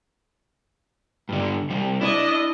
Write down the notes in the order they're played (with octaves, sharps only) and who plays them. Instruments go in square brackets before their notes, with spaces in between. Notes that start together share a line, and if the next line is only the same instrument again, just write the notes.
[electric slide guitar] G2 D3
C3 G3
[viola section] D4 D#5 [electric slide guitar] E4